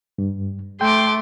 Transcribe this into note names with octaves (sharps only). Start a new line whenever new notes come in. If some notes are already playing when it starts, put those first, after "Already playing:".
G2
A3 G5 C6 D6